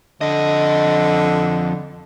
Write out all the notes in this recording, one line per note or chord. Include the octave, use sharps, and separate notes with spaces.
F2 D3 D#5